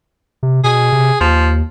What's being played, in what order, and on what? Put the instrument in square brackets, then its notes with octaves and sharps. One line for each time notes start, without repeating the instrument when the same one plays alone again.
[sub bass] C3
[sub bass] B2 [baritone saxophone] G#4
[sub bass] C3
[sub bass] D#2 [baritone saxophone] F3